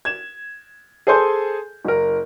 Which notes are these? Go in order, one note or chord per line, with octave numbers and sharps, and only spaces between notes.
G#6 E7
G#4 A4 C5 G#5 C6 G6
F#1 A#4